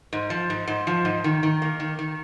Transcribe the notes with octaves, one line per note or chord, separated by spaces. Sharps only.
G#2
F3
G#2
G#2
F3
G#2
D#3
D#3
A#3
D#3
D#3